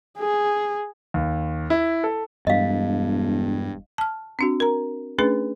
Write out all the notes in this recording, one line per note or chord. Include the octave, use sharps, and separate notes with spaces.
G#4
D#2
E4
A4
E1 G2 D#5 F5
A5 F6
C4 D4 F#4
A#4 A#5
A3 C#4 D4 G#4 B4